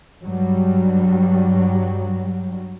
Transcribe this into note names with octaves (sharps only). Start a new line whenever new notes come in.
G2 F#3 G3